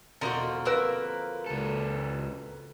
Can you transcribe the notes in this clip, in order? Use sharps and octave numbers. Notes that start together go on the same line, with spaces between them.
E1 D3 F3 F#4 A#4 C5 D#5
A#3 C4 A#4 B4 E6 A#6
C#2 A4